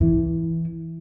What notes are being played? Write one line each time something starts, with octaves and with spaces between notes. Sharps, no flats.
E3